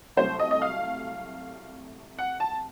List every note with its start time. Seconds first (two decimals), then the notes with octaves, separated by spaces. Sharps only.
0.17 C2 C3 F#3 A3 C5
0.40 D#5
0.51 D#5
0.62 F5
2.19 F#5
2.40 A5